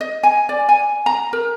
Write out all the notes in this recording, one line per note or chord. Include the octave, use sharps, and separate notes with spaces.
D#5
G#5
D5
G#5
A#5
A#4